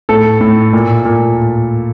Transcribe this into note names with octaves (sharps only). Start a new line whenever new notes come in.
A2 A4
A2
A#2
A#2